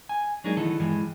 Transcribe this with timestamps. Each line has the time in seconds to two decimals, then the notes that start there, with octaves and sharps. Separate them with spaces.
0.09 G#5
0.44 F#3 G#3 A#3 D4 D#4 G#4
0.57 D#3 E3 B3 A4
0.80 G2 E3 F3 G#3